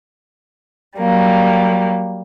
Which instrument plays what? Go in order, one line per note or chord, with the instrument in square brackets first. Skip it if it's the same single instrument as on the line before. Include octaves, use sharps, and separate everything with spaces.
[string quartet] F#3 G3 A#3